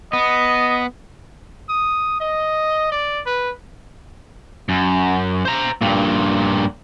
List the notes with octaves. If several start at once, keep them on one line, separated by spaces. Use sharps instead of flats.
B3 D#5
D#6
D#5
D5
B4
F#2
C5 A#5
G2 A#2